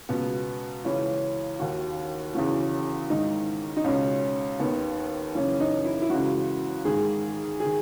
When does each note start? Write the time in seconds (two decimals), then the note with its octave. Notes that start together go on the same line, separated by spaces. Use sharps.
0.09 C#2 B2 B3
0.84 C#2 C#3 E3 C#4
1.59 D#2 D#3 F#4
2.34 E2 C#3 E3 F#4
3.10 G#2 D#3 D#4
3.77 D#4
3.84 C#2 B2 C#4
4.60 D#2 D#3 B3
5.35 F#2 C#3 E3 C#4
5.60 D#4
5.85 E4
6.02 E4
6.10 C#2 C#3 E3 F#4
6.85 G#2 D#3 G#4
7.60 D#3 G#4